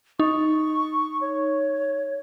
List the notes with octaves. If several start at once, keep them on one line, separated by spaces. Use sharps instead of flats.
D#4 C#6
C#5